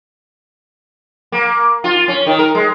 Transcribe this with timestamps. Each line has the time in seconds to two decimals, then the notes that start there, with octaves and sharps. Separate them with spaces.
1.32 A#3
1.84 F4
2.08 C#4
2.27 D#3
2.39 A#4
2.55 G#3